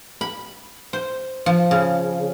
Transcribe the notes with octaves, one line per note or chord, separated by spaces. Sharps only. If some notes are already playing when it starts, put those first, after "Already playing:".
B5
C5
F3
C#3